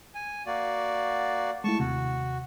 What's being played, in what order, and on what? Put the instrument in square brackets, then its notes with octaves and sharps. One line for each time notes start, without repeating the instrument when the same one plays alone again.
[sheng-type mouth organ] G#5
A#3 F#4 D5
[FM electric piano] G#3 A3 E4 [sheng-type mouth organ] A5 C#6
[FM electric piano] D#2 C3 [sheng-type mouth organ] F#4